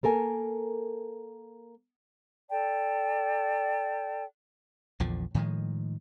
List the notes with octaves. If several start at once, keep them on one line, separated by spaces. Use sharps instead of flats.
A#3 A4 A#4 G#5
A4 D5 G5 A5
A#1 E2 D3 F3
A2 D#3 F3 G#3